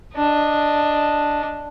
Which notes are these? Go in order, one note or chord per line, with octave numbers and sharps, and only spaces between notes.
D4 D#5